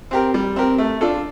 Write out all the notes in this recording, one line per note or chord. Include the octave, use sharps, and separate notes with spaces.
C4 G4 A#4
G3
C4 G4 A#4
A3
D4 F4 A4